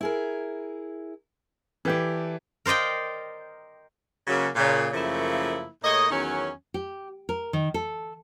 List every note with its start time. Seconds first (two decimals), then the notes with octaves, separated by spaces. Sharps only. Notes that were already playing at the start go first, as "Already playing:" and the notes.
0.01 E4 G#4 A#4
1.85 E3 G4 A4 D5
2.66 A#4 C5 D5 D#5 G5
4.27 C#3 F#3 A#3
4.56 A#2 C#3
4.93 F#2 C#3 F3 A3 A#3 E4
5.84 A2 A#3 G#4 C#5 D#5
6.11 E2 D#3 F#3 C#4
6.74 G4
7.29 A#4
7.53 D#3
7.74 A4